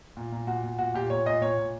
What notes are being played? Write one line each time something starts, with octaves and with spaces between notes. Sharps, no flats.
A#2
A#2
A#2 F#4
A#2
A#2 F#4
A#2 G4
A#2 C#5
A#2 D#5
A#2 C#5
A#2